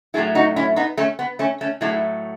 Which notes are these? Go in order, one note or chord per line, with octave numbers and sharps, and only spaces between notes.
A2 F#3 A3 E4 G#4
D#4 F#4
C#4 E4
B3 D#4
A3 C#4
B3
A3 C#4
A3 C#4
A2 F#3 A3 E4 G#4